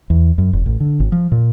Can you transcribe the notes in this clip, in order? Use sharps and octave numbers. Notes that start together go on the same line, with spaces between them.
E2
F#2
F1
A1
D3
G#1
F3
A#2